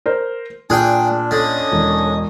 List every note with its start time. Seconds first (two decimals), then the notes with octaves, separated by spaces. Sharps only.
0.06 A#4 C5
0.70 A#2 D4 G#4 G5 F#6
1.31 D3 C#4 D#5 D#6
1.72 E1